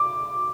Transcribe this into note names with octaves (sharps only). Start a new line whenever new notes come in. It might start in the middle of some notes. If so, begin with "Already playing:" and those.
Already playing: D6